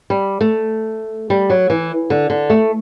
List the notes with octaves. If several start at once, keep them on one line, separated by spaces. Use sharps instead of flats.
G3
A3
G3
F#3
E3
D3
D3
A3